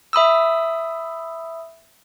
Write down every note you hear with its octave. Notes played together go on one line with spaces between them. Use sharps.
E5 B5 D#6 E6